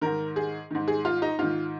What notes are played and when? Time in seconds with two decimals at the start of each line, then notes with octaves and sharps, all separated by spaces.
0.02 G#2 D#3 A#4
0.36 G#4
0.71 G#2 D#3
0.88 G#4
1.05 F4
1.22 D#4
1.39 G#2 D#3 F4